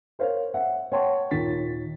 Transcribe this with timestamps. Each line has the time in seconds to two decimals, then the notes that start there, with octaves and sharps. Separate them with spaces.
0.19 A#4 C5 C#5 F5
0.54 E5 F#5
0.92 C#5 F#5 G5 A5 C6 C#6
1.31 D#2 A#2 D#3 D#4 A6 B6